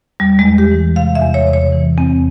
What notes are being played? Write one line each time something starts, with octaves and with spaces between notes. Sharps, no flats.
E2 G3
G#3
E2
G4
E3
C3 F5
E5
E2
C#5
C3
C#5
E3
E2 C4